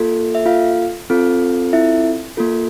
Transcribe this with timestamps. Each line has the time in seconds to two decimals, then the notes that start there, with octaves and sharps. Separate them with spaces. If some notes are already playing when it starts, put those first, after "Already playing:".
Already playing: A#3 F4 A4
0.35 E5
0.46 F4 F5
1.10 C4 F4 A4
1.73 E4 E5
2.37 A#3 F4 A4